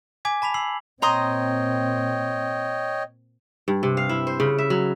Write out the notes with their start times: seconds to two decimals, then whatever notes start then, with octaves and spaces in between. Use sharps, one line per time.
0.25 G#5 D6 G#6 B6
0.42 A5 B5 B6 F7
0.54 E6 C7 F#7
1.02 A#2 C4 C#5 D#5 G5 A#5 C6 D#6
3.68 G2
3.83 C3
3.97 F5
4.09 E4
4.27 C5
4.40 C#3
4.58 E5
4.70 F#3